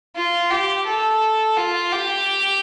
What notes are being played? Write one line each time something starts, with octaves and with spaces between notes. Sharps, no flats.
F4
G4
A4
F4
G4